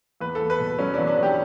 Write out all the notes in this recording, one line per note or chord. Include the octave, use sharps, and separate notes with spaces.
E2 B4
E2 A4
B4
B2
F#3 C#4
E2 D4
D4
E2
G4